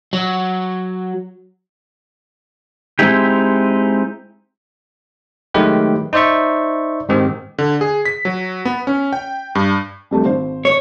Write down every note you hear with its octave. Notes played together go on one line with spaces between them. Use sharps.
F#3
G#3 C4 D#4 E4 G4
D#3 F#3 G#3 A3 G4 B4
D#4 C5 D5 E5 C#6
G#2 D#3 C4 G4
D3
G#4
B6
F#3
B3
C#4
G5
G2
F2 G3 A3
G#1 C5
C#5